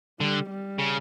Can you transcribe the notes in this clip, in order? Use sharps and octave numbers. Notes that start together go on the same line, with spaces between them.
D3 G3
G3
C#3